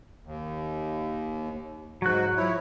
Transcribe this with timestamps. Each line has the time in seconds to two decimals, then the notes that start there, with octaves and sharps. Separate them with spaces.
0.24 D#2
2.02 G#2 F#3 F#4 F#6
2.37 F3 E4 C#5